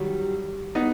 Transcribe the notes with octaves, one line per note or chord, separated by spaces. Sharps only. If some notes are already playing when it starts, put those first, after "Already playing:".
Already playing: D#3 F#3 G3
B3 D#4